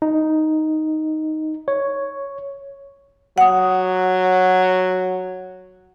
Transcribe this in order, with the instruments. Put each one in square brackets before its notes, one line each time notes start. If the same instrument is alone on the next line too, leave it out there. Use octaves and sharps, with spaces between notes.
[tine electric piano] D#4
C#5
[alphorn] F#3 [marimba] F#5 D#6